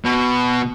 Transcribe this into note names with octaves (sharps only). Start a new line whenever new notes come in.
B2